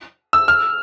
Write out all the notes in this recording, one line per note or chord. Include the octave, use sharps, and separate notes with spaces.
E6
F6